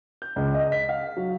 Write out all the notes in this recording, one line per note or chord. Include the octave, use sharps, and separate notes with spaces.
G6
C#2
D#5
B6
F5
F#3